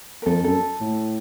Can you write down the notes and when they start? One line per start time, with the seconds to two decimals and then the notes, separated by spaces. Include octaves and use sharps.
0.22 A#4
0.26 F2 A4
0.44 F#2 A4
0.80 A2